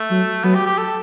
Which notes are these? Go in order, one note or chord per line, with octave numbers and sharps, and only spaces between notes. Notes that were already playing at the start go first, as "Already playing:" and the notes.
Already playing: A3
F#3
F#3 B3
G4
G4
A4